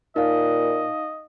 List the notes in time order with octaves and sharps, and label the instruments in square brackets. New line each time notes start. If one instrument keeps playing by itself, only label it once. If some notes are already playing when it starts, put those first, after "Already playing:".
[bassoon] A#2 [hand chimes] D#4 F5 [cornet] D#5